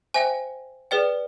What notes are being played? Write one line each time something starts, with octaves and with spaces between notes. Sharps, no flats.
C5 E5 G5 G#5
G#4 B4 D5 G5